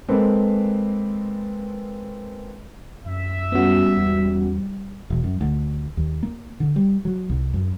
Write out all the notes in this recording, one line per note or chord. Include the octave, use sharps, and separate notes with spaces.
G#3 A#3 C4 A4 B4
F#2 E5
G#2 G3 B3 C#4 F#4
E2
E1
F#2
D2
D#2
A#3
D3
G3
F#3
C2
F#2